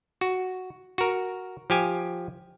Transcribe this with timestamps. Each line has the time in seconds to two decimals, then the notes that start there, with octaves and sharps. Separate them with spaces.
0.21 F#4
0.98 F#4 A#4
1.70 F3 G4 G#5